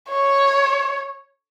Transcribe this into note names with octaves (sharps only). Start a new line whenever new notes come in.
C#5